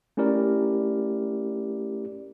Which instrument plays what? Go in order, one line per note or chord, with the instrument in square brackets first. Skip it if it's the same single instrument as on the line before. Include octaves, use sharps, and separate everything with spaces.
[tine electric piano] A3 C#4 E4 G4 A#4 D5